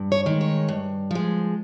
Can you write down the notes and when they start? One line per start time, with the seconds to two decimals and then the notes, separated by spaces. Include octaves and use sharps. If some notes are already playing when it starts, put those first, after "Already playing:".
Already playing: G2
0.12 C#5
0.26 D#3 G#3
0.41 C#5
0.68 G2
1.11 F3 G#3